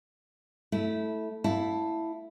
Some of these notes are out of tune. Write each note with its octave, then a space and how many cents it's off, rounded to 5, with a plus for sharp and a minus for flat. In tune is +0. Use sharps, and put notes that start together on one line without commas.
A3 +0 E4 -15
E4 +0 F5 +20 A5 +0